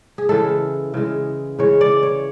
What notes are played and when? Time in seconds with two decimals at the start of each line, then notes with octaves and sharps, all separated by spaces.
0.18 G#4
0.29 C#3 E3 G#3 A4
0.94 C#3 E3 G#3
1.59 C#3 E3 G#3 C#5
1.81 D5
2.03 C#5